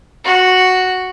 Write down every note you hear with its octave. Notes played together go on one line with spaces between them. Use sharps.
F#4